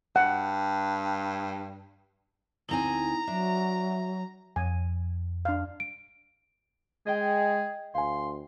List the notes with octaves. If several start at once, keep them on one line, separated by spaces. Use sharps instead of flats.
G2 F#5
D2 C4 D#4 E4 G#5 A#5
F#3 D4 E5
F2 G#5
D4 F5
D7
G#3 G#4 D#5 G5
D2 F5 G#5 C6